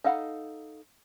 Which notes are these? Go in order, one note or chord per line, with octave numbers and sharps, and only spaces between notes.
D#4 A4 F5 F#5 B5